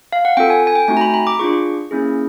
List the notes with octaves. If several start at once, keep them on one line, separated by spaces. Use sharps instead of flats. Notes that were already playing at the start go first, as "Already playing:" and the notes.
F5
F#5
C4 F4 A4 G5
G#5
G#5
G5
A3 C4 D#4 F#4 G#5
A#5
B5
B5
D6
D4 F4 G#4 C#6
A#3 C#4 E4 G#4